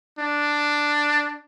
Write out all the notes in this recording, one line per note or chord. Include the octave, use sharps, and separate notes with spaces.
D4